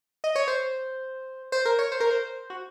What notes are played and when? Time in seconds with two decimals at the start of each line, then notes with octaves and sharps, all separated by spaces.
0.24 D#5
0.36 C#5
0.48 C5
1.52 C5
1.65 A#4
1.79 C#5
1.92 C5
2.00 A#4
2.11 C5
2.50 F#4